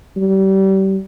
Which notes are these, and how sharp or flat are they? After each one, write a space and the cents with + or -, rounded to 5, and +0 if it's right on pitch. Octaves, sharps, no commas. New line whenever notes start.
G3 -30